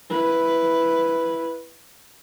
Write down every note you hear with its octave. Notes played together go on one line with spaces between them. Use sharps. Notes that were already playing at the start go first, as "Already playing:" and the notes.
E4 B4